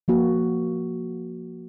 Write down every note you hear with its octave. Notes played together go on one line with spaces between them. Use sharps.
F3 A#3 F#4